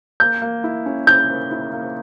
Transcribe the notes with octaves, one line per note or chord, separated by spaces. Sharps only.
A#3 G6
A#3
E4
C#4
E4 G6
A#3
E4
A#3